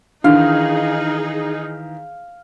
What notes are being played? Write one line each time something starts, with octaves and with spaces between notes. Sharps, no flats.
D#3 E3 D4 D#4 G#4 F5